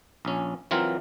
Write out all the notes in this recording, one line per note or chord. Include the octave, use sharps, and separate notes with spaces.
A#1 C#4
E3 F#3 C4 F4 A#4